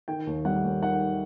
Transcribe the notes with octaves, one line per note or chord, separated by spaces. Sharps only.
D#3 G5
D#2
G3 F#5
D#2
D#3 F#5